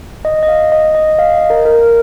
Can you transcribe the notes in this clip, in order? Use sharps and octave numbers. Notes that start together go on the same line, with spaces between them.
D#5
D#5
F5
D#5
D#5
F5
D#5
A#4
A#4